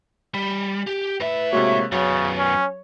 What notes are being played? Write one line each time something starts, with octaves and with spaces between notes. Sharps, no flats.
G3 B5
G4 G6
A2 B4 E5
C3 G#3 A#3 F#4 C#5
F#2 C#3 F#3 B3 C#5
C#4